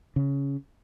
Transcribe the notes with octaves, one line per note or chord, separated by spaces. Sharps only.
C#3